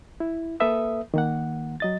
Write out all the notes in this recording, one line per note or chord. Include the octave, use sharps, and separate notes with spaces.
E4
A#3 A4 B4 E5 D#6
D#3 A#3 F#5
F#3 D#5 A6